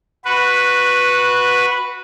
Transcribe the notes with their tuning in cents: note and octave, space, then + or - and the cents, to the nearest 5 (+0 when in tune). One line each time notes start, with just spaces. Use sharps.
F#4 -10 B4 +0